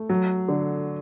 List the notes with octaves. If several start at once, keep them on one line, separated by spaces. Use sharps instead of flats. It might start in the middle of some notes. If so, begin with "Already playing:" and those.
Already playing: A3
F#3
D3